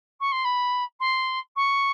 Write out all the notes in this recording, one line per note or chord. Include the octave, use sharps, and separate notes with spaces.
C#6
C6
B5
C6
C#6